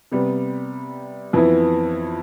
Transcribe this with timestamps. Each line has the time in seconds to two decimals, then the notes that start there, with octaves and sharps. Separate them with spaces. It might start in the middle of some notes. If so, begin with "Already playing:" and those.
0.12 C3 G3 B3
1.33 F2 E3 B3 E4